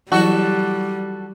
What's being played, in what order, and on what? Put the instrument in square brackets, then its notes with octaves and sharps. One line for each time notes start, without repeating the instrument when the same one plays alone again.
[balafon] E3 F#3 E4 [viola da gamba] G3 [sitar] F#4 A4